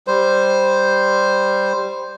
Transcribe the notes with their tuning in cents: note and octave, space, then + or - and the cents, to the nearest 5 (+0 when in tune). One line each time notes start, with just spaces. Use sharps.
G3 +0 C5 +0